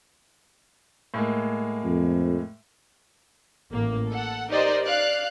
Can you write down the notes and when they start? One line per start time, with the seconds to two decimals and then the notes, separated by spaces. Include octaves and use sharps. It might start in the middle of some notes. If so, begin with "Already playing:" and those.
1.14 A2 G#3 A#3
1.84 F2
3.72 A1 A#3
4.09 A4 F#5
4.50 D#4 G4 A#4 C5 D5 D#5
4.83 D5 F5 F#6